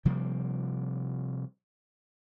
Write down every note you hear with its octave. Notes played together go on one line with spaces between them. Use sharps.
C3 F3 G3 A#3